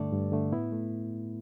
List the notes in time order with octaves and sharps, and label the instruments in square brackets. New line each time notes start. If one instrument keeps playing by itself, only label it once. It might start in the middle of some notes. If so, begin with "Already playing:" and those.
Already playing: [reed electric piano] G2 D3 A3 A4 D5
G2
D3 A3
A2 B3 E4
A3